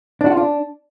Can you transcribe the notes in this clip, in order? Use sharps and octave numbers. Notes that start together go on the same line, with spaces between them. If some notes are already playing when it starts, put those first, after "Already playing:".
D4
F#4
F4
D4